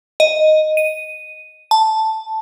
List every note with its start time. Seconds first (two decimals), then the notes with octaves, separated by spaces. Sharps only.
0.20 D#5
0.77 D#7
1.71 A5